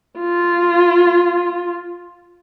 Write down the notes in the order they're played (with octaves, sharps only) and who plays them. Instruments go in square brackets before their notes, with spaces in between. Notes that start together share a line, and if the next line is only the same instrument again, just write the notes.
[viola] F4